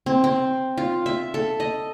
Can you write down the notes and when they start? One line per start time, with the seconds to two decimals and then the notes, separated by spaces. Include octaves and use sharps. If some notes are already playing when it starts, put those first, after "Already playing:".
0.06 C4
0.24 C4
0.77 F4
1.06 E5
1.34 A4
1.60 D#5